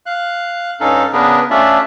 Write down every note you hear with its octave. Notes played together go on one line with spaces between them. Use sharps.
F5 F#6
G2 C#4 D#4 A4 F5
C#3 B3 D4 G#4 A#4 B4
A3 C#4 D4 F4 D5 E5